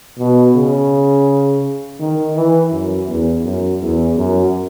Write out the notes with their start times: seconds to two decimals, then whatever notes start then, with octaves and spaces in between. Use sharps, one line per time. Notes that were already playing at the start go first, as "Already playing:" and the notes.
0.18 B2
0.54 C#3
2.00 D#3
2.35 E3
2.72 F#2
3.07 E2
3.44 F#2
3.80 E2
4.16 F#2